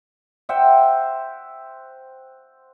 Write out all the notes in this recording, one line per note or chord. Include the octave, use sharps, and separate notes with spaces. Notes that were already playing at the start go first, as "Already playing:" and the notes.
C5 E5 F#5 G5